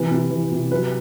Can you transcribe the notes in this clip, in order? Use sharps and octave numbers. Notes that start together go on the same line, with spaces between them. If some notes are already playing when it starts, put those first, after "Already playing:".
Already playing: C3 E3
C3
E3
C3
F#3 B4